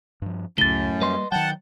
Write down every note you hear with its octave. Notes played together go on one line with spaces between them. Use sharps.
G2 F3
C#2 F#2 A2 C#3 A6 G7
G3 A#3 B4 D#5 C6
D#3 F#3 F#5 G5 A5